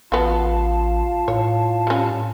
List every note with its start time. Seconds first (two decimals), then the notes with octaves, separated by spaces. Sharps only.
0.12 A1 B3 F4 F#4 F5 A5
1.28 A2 C#5
1.87 G3 C#4